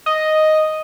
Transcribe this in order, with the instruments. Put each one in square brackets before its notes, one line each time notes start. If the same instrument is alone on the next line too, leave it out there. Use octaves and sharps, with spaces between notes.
[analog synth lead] D#5